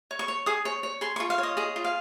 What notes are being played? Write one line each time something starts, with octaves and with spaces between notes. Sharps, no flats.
C#5
C#6
C#5
G#4 D#6
C#5
C#5
G#4 C6
F4 C#6
F5
C#5
D#5
G#4 D#5
F4
F5